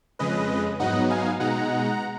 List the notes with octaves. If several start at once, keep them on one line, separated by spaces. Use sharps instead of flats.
F2 C#3 G#3 B4 D#5
G#2 F#3 B3 D#4 D#5 F#5
F5 G#5
B2 G#3 D#4 F#5 A#5